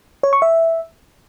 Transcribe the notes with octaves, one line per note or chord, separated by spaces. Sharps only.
C#5
C#6
E5